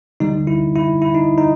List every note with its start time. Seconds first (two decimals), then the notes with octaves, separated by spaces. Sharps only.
0.20 D3 G3 D#4
0.47 E4
0.75 E4
1.02 E4
1.14 D#4
1.38 D#4